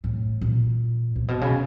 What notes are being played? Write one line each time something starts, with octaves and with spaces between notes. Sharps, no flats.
A2
A#2
A#2
B2
C#3